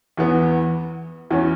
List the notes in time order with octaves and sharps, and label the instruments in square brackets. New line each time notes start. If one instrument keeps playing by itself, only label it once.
[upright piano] E2 E3 B3
E2 E3 C#4